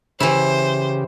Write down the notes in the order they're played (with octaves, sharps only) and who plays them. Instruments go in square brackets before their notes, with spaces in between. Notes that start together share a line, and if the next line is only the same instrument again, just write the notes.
[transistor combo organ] C#3 G4 [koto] E3 E4 [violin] C5